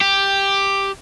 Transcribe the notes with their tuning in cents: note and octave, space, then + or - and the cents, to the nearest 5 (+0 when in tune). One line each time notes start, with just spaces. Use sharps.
G4 +5